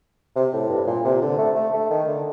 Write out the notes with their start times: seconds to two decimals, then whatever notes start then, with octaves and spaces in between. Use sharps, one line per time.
0.35 C3
0.53 A2
0.69 G2
0.87 A#2
1.05 C3
1.21 D3
1.38 A3
1.56 A3
1.73 A3
1.90 D#3
2.07 D3